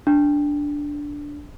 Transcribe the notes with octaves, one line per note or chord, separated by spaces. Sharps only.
D4